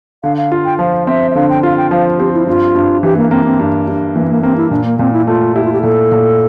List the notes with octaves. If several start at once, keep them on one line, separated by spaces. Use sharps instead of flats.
D3 F5
F5
F4
G5
F3 F5
C4 E5
E5
D3 F5
G5
F4 F5
G5
F3 F5
C4 G4
E4
G2 F4
G2
E3 G4
A#3
A#3 C4
C4
G2
G2
E3 A#3
C4
A#3
A#3 C4
E4
A#2 D4
A#3
A#2 C4
E4
A3 F4
E4 G4
F4
G4
A#2 A4
A#2